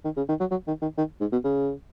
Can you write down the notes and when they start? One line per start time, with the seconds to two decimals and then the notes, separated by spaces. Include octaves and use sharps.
0.05 D#3
0.17 C#3
0.29 D#3
0.40 F#3
0.51 F#3
0.68 D#3
0.82 D#3
0.98 D#3
1.21 G#2
1.32 B2
1.44 C#3